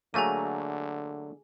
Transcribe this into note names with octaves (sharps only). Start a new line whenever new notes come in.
D3 F#3 A3 A#3 G#4 G#5 D#7